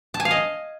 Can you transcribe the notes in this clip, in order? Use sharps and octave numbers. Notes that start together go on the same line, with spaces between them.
A5
G#5
F5
D#5